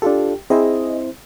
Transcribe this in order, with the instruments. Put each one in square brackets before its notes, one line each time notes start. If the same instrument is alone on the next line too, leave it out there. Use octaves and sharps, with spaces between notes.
[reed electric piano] D4 F4 A4 [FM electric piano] G4
[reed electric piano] C4 E4 C5 [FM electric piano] G#4 D#5